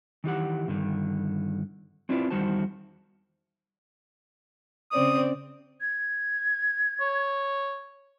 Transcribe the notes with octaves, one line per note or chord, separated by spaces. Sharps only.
D#3 E3 G4 F#5
G2 D3 D#3
C4 D4 E4 F4 B4 D5
E2 D#3 G3 F#4 C5 A5
C#3 C4 D5 D#6
G#6
C#5